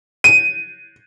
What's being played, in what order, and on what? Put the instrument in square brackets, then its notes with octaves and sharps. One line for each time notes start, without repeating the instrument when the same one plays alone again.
[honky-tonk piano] D#7